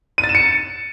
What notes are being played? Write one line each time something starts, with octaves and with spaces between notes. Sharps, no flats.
D#7
A6
E7
C#7